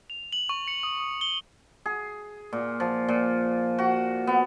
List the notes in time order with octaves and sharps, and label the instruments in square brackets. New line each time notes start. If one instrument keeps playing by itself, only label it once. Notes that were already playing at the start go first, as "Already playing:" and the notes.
[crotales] F7
F#7
C#6
C#7
D#6
D#6
G7
[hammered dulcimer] G#4
A#2
F3
A#2
F#4
B3